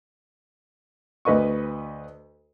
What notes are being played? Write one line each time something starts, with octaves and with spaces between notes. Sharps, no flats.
D2 B4 D#5 C#6